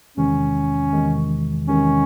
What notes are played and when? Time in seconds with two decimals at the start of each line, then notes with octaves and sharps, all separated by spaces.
0.17 E2 C3 D#3 G#3 C#4
0.93 E2 C3 D#3 G#3
1.67 E2 C3 D#3 G#3 C#4